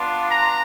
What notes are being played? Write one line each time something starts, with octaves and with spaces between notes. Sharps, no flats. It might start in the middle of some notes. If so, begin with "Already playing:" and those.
Already playing: B3 D4 F4
A#5